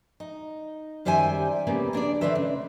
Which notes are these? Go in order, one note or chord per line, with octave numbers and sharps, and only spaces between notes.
D#4
F#2 D#3 G3 C5 E5 G#5
C#3 A#3 B3 G4
A#3 D4 G#4 D5
D3 D#3 A3 B4 C5 E5
C#3